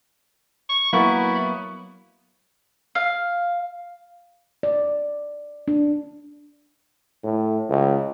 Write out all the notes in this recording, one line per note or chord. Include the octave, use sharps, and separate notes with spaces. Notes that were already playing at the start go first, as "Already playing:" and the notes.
C#6
F#3 A#3 B3 E4 C#6
F5
D5
D4
A2
C#2